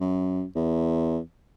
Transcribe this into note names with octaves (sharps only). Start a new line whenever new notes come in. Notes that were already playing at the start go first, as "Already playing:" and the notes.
F#2
E2